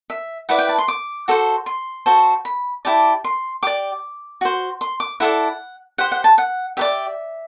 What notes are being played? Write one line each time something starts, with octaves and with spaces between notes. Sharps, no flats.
E5
E4 B4 D5 F#5
G5
A5
C6
D6
F#4 A4 C5
C6
F#4 A4 C5
B5
E4 G4 D5 A5
C6
G4 D5 D6
F#4 C5
C6
D6
E4 A4 D5 F#5
G4 C5 F#5
F#5
A5
F#5
G4 B4 D5 E5